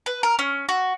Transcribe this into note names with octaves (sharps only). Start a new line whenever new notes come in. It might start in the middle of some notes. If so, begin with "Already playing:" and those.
B4
A#4
C#4
F#4